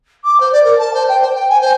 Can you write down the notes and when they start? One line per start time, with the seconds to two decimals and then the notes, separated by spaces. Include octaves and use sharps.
0.24 D6
0.40 C5
0.52 D5
0.64 A#4
0.78 A5
0.94 C5
1.09 G5
1.21 C5
1.34 G5
1.49 G#5
1.61 C5